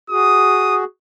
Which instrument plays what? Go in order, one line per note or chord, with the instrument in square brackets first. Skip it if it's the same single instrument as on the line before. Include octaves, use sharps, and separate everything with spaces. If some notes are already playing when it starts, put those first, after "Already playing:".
[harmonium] F#4 G#4 [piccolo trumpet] D#6